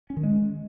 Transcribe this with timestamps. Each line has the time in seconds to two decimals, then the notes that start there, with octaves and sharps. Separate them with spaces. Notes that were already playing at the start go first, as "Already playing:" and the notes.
0.10 C#4
0.17 D#3
0.23 G#3